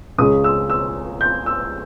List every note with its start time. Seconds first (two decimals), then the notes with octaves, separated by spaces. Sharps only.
0.18 C#2 C#3 G#3 C#4 D#6
0.44 E6
0.70 E6
1.21 G6
1.46 E6